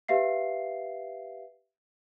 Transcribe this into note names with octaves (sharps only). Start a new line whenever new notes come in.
G4 B4 E5 F5 C7